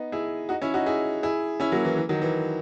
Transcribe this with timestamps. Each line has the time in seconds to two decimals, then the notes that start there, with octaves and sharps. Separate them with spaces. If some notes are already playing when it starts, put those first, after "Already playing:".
Already playing: B3 D#4
0.12 E4 G#4
0.49 D#4 F#4
0.62 C#4 E4
0.74 D#4 F#4
0.86 E4 G#4
1.23 E4 G#4
1.60 C#4 E4
1.72 F#3 A#3
1.85 E3
1.97 E3
2.09 D#3 F#3
2.22 E3